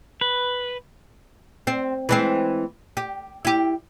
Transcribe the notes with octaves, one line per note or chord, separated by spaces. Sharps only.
B4
C4
E3 G#3 C4
G4
E4 G4